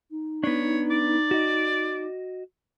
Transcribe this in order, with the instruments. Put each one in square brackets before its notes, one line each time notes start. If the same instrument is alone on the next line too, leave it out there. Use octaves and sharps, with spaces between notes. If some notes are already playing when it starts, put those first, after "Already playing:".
[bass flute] D#4
[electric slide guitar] B3 D4 [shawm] C#5
[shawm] D5
[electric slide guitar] F#4 D#5